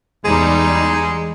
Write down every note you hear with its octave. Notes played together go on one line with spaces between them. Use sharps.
E2 G3 G#3 D#4